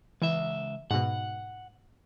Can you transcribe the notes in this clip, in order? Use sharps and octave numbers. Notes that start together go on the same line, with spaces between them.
C#2 E3 E5
G#2 B2 F#5